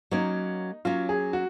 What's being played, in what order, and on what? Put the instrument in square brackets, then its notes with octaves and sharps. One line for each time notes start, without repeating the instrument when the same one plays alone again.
[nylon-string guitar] F#3 A#3 C#4 [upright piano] D#4
[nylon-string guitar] F#3 A#3 C#4 [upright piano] F4
[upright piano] G#4
F#4